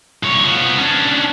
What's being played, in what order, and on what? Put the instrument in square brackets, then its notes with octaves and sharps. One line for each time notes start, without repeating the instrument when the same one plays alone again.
[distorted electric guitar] C2 C#5
F3 B3
C#4 D4